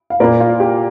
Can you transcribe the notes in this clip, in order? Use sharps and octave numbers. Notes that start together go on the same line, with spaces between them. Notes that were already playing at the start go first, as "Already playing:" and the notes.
F5
A#2 A#3 A#4 D5
F4
G4